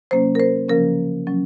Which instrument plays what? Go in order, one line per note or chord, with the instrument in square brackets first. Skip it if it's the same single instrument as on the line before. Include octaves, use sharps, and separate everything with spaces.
[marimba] C3 F#3 A#3 C#4 C5
A#4
C5
C#3 F3 A#3 C#4 A#4
F#3 C#4